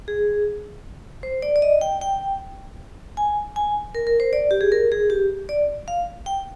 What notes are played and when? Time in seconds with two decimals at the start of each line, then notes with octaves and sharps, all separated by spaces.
0.08 G#4
1.23 C5
1.42 D5
1.56 D5
1.62 D#5
1.81 G5
2.01 G5
3.17 G#5
3.56 G#5
3.95 A#4
4.07 A#4
4.20 C5
4.33 D5
4.51 G4
4.61 G#4
4.72 A#4
4.92 G#4
5.10 G4
5.49 D5
5.88 F5
6.26 G5